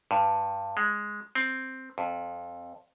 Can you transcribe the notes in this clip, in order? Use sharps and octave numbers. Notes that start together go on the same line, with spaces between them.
G2
G#3
C4
F2